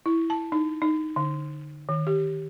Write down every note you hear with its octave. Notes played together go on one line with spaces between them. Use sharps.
E4
A5
D#4
D#4
D3
D#3
G4